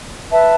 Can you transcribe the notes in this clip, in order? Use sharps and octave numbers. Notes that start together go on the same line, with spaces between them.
B4 E5 A5